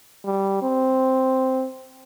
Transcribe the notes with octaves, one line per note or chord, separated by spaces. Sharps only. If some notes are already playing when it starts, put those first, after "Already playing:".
G3
C4